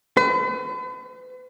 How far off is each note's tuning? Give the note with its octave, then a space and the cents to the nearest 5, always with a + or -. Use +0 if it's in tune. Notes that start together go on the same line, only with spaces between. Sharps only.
B4 +40